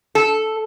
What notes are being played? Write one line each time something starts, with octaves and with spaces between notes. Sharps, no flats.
A4